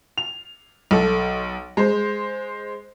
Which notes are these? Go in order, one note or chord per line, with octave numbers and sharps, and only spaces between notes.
F7
B1 A4
G#3 C5